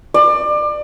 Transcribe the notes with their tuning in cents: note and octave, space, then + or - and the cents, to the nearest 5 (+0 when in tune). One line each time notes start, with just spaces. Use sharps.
D5 +25